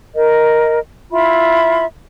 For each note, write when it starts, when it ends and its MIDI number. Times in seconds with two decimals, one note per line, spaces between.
0.15 0.78 70
0.15 0.78 75
1.12 1.85 64
1.12 1.85 65
1.12 1.85 76
1.12 1.85 83